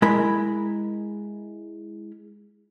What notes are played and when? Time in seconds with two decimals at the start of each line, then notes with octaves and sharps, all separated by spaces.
0.02 G#3 E4 A#4 B5